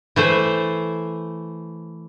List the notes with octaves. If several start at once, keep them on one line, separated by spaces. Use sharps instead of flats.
E3 A3 C5